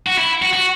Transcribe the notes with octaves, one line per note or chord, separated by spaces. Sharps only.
F#4
E4
F#4
F#4